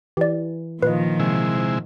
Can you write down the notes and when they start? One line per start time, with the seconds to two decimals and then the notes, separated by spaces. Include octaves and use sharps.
0.17 E3 G4 D5
0.82 A#2 D#3 F3 F4 B4 D#5
1.20 C3 G#3 E4